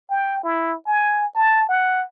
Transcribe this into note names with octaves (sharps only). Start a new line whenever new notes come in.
G5
E4
G#5
A5
F#5